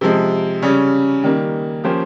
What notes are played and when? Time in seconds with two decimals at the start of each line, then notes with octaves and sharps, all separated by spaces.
0.01 C3 F3 G#3
0.62 C#3 G3 C#4
1.23 D#3 G3 A#3
1.84 F3 A#3 C#4 G4 C5